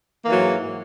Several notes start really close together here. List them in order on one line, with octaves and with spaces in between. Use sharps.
A#3 E3 F#3 G#2